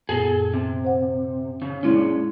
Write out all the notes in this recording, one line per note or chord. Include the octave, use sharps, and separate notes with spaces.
F#2 A#2 B3 G#4 A4
C3
C5 F#5
C#3
A#2 G#3 C#4 D4 E4